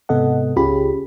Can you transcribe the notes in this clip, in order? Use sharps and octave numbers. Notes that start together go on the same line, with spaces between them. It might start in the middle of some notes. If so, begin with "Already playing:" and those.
G#2 C3 B3 A4 D#5 F#5
C#2 C#4 F4 G4 G#4 B5